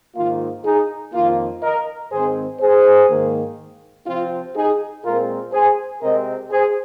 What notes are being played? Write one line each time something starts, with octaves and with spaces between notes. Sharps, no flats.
G#2 D#3 A#3 F4
D#4 G#4
F2 D#3 A#3 F4
A#4 D#5
G#2 D#3 G#3 C4 G#4 C5
G#4 C5
G#2 D#3 A#3
C3 F3 C4 F4
D#4 G#4
A#2 G#3 C4 F4 A#4
G#4 C5
C3 G#3 C4 A#4 D#5
G#4 C5